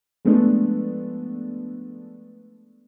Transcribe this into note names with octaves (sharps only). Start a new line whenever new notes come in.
F3 G#3 A3 B3 D4